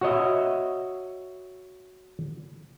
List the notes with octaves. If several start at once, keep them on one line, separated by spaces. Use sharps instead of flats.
F#4 C#5 D#5 E5